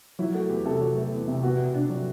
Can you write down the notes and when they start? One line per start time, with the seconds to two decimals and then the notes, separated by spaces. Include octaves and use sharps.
0.19 F#3 E4
0.34 A3 F#4
0.50 E2 G4
0.65 C3 A4
0.81 F#3
0.96 A3
1.12 E2
1.28 C3
1.43 B3 F#4
1.59 B2
1.74 B2 D4
1.90 F#3